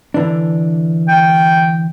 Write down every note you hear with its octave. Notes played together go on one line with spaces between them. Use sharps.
D3 E3 D4
G5